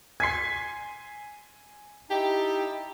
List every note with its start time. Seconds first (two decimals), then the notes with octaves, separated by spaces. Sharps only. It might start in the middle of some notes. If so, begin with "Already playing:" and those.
0.20 G#5 C6 G#6 B6 C7
2.10 D#4 E4 G4 A5